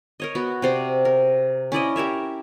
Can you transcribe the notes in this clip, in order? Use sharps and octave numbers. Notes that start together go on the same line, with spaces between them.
A#4 C#5 D#5
B3 F#4
C3 C5 D5
A#4
C#4 E4 D5 D#5
G4 A#4 C#5 E5